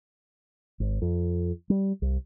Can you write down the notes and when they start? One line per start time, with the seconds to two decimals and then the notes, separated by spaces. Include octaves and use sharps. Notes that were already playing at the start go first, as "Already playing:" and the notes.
0.80 G#1
1.02 F2
1.70 G3
2.02 C2